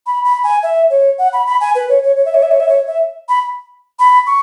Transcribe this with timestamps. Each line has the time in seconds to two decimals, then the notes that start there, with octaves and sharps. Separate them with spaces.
0.06 B5
0.25 B5
0.44 G#5
0.63 E5
0.90 C#5
1.18 F#5
1.33 B5
1.46 B5
1.60 G#5
1.75 B4
1.89 C#5
2.03 C#5
2.16 C#5
2.25 E5
2.34 C#5
2.43 E5
2.51 C#5
2.60 E5
2.69 C#5
2.87 E5
3.29 B5
3.99 B5
4.26 C#6